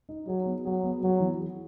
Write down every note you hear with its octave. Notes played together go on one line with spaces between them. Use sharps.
D#4
F#3 G#4
B3
F#3 G#4
B3
F#3 B3
E3
G#4